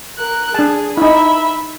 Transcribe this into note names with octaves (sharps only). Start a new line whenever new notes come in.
A#4 F#6
D4 G#4 A5
D#4 E4 E5 B5